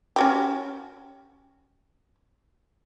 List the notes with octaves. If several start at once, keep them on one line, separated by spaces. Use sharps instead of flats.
C#4 F#4 G4